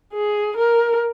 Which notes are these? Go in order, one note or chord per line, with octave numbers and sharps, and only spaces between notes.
G#4
A#4